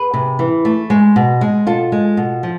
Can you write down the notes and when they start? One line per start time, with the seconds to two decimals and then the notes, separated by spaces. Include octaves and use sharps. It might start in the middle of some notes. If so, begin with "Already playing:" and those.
Already playing: G#4 B4
0.14 C3
0.39 E3
0.65 A3
0.90 G#3
1.16 B2
1.41 G#3
1.67 B2 F4 A4
1.92 G#3
2.17 B2
2.43 F3